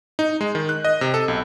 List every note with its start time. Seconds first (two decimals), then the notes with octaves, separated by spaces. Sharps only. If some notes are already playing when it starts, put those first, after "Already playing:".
0.19 D#4
0.41 G#3
0.55 D#3
0.69 F#6
0.85 D#5
1.01 C3
1.14 A4
1.28 B1